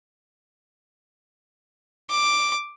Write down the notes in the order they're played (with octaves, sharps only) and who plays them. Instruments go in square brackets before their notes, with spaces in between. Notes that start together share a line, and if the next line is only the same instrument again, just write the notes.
[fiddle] D6